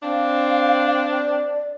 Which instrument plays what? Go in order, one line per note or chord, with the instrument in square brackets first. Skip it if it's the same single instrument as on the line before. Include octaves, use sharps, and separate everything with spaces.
[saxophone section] C4 D4 [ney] F5
[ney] D5